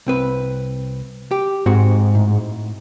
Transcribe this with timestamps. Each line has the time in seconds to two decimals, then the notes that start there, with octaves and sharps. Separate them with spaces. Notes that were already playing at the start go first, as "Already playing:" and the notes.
0.07 C2 C4 B4
1.31 G4
1.66 G#2 C4 F#4
2.15 A2